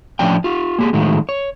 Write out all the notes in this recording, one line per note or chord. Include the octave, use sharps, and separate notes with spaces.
A2 F3 C#4 D4 G5
F4 G4
A#3 G4 G#4
A2 D#3 F3 F#3 G#3 A3
C#5